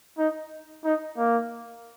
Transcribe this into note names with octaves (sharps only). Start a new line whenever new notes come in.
D#4
D#4
A#3